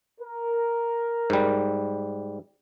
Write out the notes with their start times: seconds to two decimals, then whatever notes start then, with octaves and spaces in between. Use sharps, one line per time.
0.20 A#4
1.30 G#2 G3